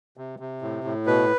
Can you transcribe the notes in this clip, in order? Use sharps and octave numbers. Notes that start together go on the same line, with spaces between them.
C3
C3
A2
A2
B2 B4